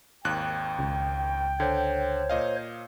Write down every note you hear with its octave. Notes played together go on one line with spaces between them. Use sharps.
G#1 D#2 G5 F#6
C#2
D3 C5 C#5
A#2 D#5 F5